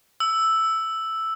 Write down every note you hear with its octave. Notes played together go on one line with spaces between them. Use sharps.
E6